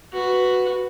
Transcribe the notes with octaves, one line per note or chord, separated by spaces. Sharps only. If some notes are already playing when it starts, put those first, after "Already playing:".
F#4 B4